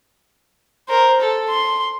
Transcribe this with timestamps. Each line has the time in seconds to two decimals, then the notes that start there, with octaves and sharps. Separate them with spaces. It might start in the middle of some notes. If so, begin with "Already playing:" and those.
0.88 A#4 C5
1.21 A4
1.49 C6